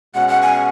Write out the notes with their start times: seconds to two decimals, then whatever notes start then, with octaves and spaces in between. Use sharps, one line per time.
0.15 B2 G#3 C#4 F#5
0.28 F#5
0.42 G#5